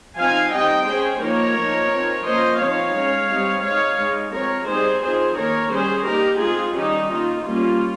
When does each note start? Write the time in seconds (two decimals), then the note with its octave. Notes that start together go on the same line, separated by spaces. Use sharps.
0.17 F3 C4 D#4 F5 G#5
0.52 G3 C4 D#4 D#5 G5
0.87 G#3 C#4 G#4 C5
1.22 F3 A#3 D#4 A#4 C#5
1.57 F3 A#3 D#4
1.92 F3 C4 D#4
2.25 F3 A#3 C#4 C5 D#5
2.60 F3 C4 D#4 C#5 F5
2.95 G#3 C#4
3.30 G3 C4 D#4
3.64 G#3 D#4 C#5 F5
4.00 G#3 D#4
4.33 F3 G#3 C4 A#4 C#5
4.68 G3 C4 D#4 G#4 C5
5.02 F3 C4 D#4 G#4 C5
5.37 D#3 A#3 C#4 A#4 C#5
5.72 G3 C#4 G#4 C5
6.06 G3 A#3 D#4 G4 A#4
6.41 G#3 C4 D#4 F4 G#4
6.75 D#3 G3 C#4 D#4 G4
7.10 D#3 A#3 D#4 F4
7.45 G3 A#3 C#4 F4